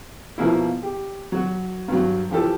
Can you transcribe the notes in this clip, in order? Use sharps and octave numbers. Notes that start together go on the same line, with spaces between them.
B2 F3 A#3 E4
G4
F#3 F#4
G2 F#3
E3 F3 G4 A4